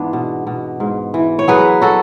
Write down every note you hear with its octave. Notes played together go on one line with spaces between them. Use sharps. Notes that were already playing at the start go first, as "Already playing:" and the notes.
Already playing: G#2 E3 B3 D4
B2
B2
G#2
E3
C#5
F#3 G#4 B4
F#3 F#4 A4